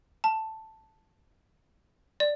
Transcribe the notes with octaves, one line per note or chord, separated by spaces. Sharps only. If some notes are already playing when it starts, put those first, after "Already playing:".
A5
D5